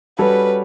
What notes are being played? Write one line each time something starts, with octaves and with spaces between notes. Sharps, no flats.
G3 C#4 F#4 A4 B4 C#5